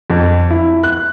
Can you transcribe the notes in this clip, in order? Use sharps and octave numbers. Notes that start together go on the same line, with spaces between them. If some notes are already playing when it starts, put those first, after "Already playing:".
F2
E4
F#6